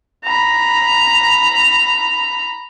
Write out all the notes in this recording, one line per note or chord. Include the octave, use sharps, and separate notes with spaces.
A#5 B5